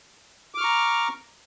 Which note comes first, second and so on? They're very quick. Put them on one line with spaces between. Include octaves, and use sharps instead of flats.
D6 F6 C#6 A#5